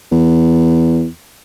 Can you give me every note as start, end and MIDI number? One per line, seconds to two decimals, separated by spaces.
0.12 1.07 40